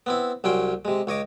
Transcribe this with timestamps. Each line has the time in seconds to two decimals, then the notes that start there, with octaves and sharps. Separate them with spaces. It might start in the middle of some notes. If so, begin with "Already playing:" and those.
0.06 B3 C4 E4
0.44 C2 F#3 C#4 C5 G5
0.85 C3 G#3
1.07 C#2 C#5 D#5 D6